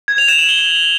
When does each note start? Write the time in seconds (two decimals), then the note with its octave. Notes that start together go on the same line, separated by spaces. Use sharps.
0.08 G#6
0.18 F7
0.28 E7
0.39 F#7
0.49 G7